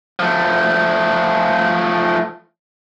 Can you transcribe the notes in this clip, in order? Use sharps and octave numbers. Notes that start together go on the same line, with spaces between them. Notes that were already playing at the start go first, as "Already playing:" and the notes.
F3 A3